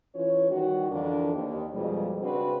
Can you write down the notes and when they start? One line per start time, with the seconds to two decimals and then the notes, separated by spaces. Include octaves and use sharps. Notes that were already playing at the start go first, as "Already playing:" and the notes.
0.15 E3 C#4 F4 C#5
0.51 D#3 G3 F#4
0.90 F2 D3 E3 D4 A#4
1.34 D#2
1.74 F2 B2 F3 G3 G#3
2.21 C#3 C4 D4 F#4 B4